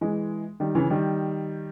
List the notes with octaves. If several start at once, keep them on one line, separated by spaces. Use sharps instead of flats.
E3 G#3
D#3 G3
C#3 E3
D#3 G3